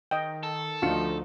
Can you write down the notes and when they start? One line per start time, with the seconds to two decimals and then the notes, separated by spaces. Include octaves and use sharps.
0.11 D#3 D#5 G5
0.43 A4
0.82 D2 F3 A3 D4 D#4 F4 F#4 C#7